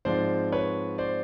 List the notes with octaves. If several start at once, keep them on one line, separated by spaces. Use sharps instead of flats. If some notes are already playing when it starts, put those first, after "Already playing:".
G#2 F3 G#3 C4 C5 D5
B4 C#5
C5 D5